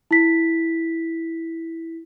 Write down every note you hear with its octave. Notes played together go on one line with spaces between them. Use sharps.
E4 B6